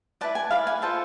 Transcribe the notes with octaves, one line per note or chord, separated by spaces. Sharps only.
E4 B4 D5 A5
G#5
E4 B4 D5 F5
G#5
F4 A4 C5 A5